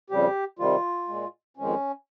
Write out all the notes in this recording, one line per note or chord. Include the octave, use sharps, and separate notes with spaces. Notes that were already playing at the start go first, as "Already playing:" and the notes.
F2 C#3 G3 G4
C3 D#3 G3 F4
A#2 G#3
F2 D#3 G#3 C#4